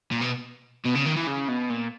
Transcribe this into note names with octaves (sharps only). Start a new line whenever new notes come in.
A#2
B2
B2
C#3
D#3
E3
C#3
B2
A#2